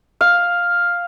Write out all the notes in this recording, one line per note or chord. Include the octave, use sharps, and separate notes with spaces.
F5